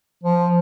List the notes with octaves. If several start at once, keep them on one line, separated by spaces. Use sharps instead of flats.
F3